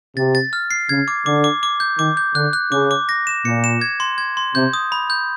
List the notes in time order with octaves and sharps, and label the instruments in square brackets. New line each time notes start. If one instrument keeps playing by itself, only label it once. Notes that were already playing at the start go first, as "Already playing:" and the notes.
[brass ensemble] C3 [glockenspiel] A6
[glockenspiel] A6
F6
C7
[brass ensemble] C#3 [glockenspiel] G#6
[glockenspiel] D6
[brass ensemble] D3 [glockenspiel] D6
[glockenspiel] D6
D6
G6
[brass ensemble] D#3 [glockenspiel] D6
[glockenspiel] G6
[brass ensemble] D3 [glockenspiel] F#6
[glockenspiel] F#6
[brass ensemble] C#3 [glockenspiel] D6
[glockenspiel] D6
A#6
E7
[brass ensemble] A#2 [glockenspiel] C#7
[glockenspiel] E7
G#6
C6
G#6
C6
[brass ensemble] C3 [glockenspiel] G6
[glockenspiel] D#6
B5
G6